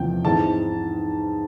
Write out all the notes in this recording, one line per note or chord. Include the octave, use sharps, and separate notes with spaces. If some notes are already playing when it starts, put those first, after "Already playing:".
Already playing: E2 C3 F3 G5
G#2 E3 G#3 C4 A5